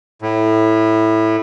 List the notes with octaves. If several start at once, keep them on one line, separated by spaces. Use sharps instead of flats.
A2